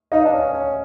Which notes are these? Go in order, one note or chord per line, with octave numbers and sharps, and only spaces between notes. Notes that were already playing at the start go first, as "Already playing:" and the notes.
D#4 D#5 F5
D4
C#4
C#4